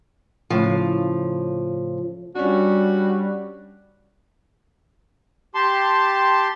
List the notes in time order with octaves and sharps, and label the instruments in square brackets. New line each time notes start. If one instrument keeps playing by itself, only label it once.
[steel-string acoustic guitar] A2 C#3 F3
[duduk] G3 [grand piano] C#4 D4 [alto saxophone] F#4
[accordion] G4 A5 C6